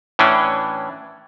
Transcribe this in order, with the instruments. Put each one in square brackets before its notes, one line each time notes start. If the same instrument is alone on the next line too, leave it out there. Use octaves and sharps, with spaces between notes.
[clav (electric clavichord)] A2 E3 C#4 D4